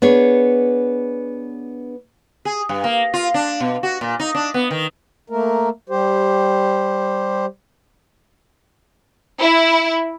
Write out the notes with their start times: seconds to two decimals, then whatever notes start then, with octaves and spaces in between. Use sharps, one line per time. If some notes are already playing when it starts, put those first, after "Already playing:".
0.02 B3 D4 G#4 C#5
2.45 G#4
2.69 G2
2.84 A#3
3.14 F4
3.34 D4
3.60 B2
3.83 F#4
4.01 A#2
4.20 D#4
4.35 D4
4.54 B3
4.71 D#3
5.30 A3 A#3 A#4
5.90 G3 G4 C5
9.40 E4